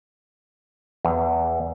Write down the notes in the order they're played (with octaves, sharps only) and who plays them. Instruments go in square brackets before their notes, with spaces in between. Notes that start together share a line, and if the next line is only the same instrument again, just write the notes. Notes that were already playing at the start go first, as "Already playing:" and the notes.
[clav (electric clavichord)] E2